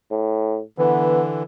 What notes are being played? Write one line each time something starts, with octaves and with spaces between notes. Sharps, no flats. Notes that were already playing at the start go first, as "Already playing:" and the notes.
A2
D3 E3 B3